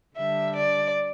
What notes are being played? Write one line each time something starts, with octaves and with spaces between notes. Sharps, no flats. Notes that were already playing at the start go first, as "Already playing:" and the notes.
D3 G3 D4 E5
D5